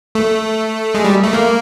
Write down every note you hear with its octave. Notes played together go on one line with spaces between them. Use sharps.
A3
G#3
G3
A3
A#3